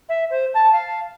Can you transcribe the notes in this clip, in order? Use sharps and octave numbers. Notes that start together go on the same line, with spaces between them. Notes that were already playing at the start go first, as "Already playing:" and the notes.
E5
C5
A5
F5